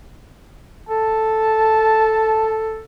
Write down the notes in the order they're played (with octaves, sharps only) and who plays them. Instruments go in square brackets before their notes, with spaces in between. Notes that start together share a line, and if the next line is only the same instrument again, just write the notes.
[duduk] A4 [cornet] A5